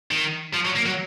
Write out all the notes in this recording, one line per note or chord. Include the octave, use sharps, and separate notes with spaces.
D#3
F3
F#3
A#3
F#3